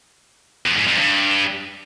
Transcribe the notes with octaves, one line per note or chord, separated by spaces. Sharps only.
F2
G#2
F2
G2